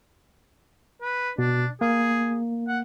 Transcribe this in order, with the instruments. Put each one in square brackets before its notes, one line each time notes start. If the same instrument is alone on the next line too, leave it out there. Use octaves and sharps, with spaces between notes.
[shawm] B4
[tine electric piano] B2 [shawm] D4
[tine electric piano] A#3 [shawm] G#4
[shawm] F#5